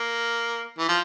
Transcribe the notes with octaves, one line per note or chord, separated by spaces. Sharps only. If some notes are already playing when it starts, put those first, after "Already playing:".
Already playing: A#3
E3
F3